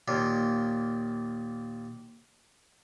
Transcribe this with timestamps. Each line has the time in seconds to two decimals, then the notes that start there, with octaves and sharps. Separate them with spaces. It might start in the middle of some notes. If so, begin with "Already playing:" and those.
0.08 D#2 A#2